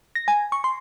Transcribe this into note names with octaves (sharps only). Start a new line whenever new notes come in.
A#6
G#5
C#6
C6